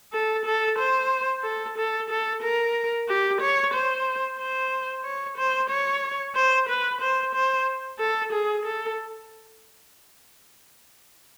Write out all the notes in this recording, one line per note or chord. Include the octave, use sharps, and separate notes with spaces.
A4
A4
C5
A4
A4
A4
A#4
G4
C#5
C5
C5
C#5
C5
C#5
C5
B4
C5
C5
A4
G#4
A4